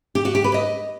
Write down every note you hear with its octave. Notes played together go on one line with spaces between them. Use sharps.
G4
F#4
G4
B4
D#5